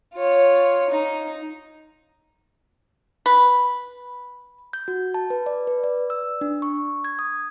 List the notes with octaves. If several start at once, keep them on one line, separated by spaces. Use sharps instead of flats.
F4 C#5
D#4
B4
G6
F#4
A5
B4
D5
B4
D5
E6
D4
C#6
G#6
D#6